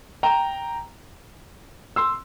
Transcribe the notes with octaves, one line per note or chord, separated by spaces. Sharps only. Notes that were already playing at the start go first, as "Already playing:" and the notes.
G5 A#5
C6 E6